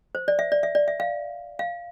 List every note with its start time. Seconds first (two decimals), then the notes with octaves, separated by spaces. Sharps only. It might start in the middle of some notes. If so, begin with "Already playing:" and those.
0.15 C5
0.28 D5
0.39 E5
0.52 D5
0.63 E5
0.75 D5
0.88 E5
1.00 F5
1.59 F5